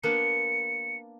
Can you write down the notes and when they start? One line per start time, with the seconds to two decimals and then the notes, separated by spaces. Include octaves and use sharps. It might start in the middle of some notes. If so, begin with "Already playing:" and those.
0.03 A#3 B3 D4 C#7